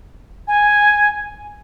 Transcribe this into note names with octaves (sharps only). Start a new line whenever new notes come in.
G#5